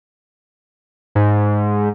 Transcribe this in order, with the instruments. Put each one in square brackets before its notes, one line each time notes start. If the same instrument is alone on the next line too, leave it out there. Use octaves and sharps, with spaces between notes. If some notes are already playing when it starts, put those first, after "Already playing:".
[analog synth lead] G#2